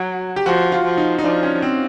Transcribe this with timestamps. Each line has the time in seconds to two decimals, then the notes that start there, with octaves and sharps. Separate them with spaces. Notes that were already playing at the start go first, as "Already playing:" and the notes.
Already playing: F#3 F#4
0.36 G4
0.46 F3 F#4
0.72 F4
0.85 F3
0.97 D#4
1.18 D#4
1.24 F3 D4
1.43 C#4
1.62 C4